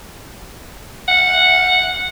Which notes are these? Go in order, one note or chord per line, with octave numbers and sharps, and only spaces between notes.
F#5